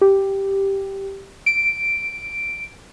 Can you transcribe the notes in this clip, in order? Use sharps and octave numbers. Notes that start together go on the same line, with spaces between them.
G4
D7